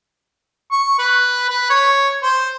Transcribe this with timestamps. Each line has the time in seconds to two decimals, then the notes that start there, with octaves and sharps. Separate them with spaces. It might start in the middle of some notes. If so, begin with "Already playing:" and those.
0.72 C#6
0.99 B4
1.50 B4
1.70 C#5
2.23 C5